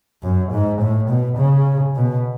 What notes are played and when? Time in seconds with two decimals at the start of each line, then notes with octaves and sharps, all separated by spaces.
0.23 F#2
0.52 G#2
0.80 A2
1.09 B2
1.37 C#3
1.95 B2